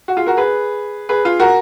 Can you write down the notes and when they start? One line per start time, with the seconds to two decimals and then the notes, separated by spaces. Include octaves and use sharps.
0.08 F#4
0.17 F4 G#4
0.26 F#4 A#4
0.37 G#4 B4
1.09 G#4 B4
1.25 F4 G#4
1.40 F#4 A#4